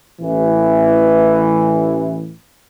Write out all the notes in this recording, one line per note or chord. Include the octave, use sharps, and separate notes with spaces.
A1 E3